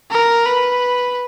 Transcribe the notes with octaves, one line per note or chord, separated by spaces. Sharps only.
A#4
B4